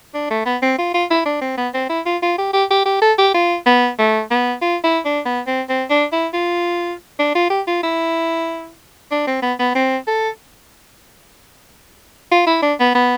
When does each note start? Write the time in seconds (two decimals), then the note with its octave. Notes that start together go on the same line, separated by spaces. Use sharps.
0.14 D4
0.30 A3
0.46 B3
0.62 C4
0.78 F4
0.94 F4
1.10 E4
1.25 D4
1.41 C4
1.57 B3
1.74 C4
1.89 E4
2.06 F4
2.22 F4
2.38 G4
2.53 G4
2.71 G4
2.86 G4
3.01 A4
3.18 G4
3.34 F4
3.66 B3
3.98 A3
4.31 B3
4.62 F4
4.84 E4
5.05 D4
5.26 B3
5.47 C4
5.69 C4
5.90 D4
6.12 E4
6.33 F4
7.19 D4
7.35 F4
7.50 G4
7.67 F4
7.83 E4
9.11 D4
9.27 C4
9.42 B3
9.59 B3
9.75 C4
10.07 A4
12.31 F4
12.46 E4
12.62 D4
12.80 B3
12.95 B3